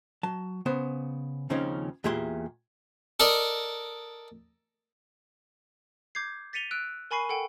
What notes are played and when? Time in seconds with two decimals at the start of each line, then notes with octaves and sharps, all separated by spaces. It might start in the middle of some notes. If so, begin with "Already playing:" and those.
0.23 F#3 A5
0.66 C#3 B3 C5
1.50 D#2 C#3 F3 C4 C#4 D#4
2.04 E2 A#2 G4 G#4 E5 C6
3.20 A4 A#4 D5 D#5
6.15 D6 G6 G#6 C7
6.53 A6 B6 C#7 D#7 F7 G7
6.71 E6 F#6 D7
7.11 A#4 G#5 B5 C#6 C7 D#7
7.29 A4 F#5 G5